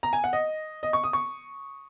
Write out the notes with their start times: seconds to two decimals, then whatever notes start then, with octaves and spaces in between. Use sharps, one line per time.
0.03 A#5
0.13 G#5
0.24 F#5
0.33 D#5
0.83 D#5
0.93 C#6
1.04 D#6
1.13 C#6